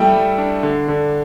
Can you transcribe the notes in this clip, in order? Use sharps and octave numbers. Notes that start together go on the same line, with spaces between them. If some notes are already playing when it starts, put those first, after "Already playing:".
Already playing: G3 A3 E4 E5 G5
G3
D4
D3
D3